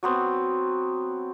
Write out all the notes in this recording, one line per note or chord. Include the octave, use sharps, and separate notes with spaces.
F#3 B3 C4